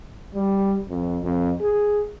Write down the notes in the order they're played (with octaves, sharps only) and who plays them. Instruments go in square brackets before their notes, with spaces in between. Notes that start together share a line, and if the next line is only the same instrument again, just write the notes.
[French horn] G3
F2
F2
G#4